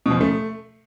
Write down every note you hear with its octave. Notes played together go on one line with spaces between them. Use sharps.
B2
F3
C#3
A3